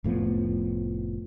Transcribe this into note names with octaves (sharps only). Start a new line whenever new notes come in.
F1 A2 F3 B3